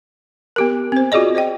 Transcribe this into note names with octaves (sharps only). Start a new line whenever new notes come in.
B3 G4 A#4
C4 C5
F4 F#4 G#4 D5 D#5
C5 D5 D#5 G5